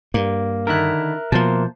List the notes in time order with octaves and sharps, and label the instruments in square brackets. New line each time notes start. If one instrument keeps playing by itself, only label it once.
[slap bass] G2 [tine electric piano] A#3
[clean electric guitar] D3 D#3 E4 [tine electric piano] A#4 E5 F#6
[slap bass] B2 F3 [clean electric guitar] A#3 C5 A5